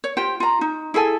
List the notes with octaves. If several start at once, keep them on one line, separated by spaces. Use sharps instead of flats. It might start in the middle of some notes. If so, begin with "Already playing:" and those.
C#5
F4 G4 C5 G5
F4 A#5
D#4
E4 G#4 A4 G#5